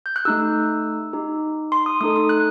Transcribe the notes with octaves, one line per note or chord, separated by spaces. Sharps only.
G6
F#6
A3 D#4 G4 E6
D#4 G4
C6
D#6
A3 D#4 A4 D#6
D#6
F#6